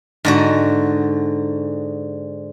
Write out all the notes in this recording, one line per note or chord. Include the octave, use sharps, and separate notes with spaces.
G#2 D3 F#4